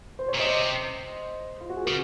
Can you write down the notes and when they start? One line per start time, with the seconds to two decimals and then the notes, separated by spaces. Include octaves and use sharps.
0.19 C5
0.28 C#5
0.35 A#2
0.39 C3 C5 D#5
1.60 F4
1.69 F#4
1.77 G#4
1.85 C#3 A#4